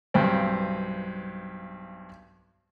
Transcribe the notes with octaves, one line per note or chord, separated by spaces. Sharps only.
B1 G2 C4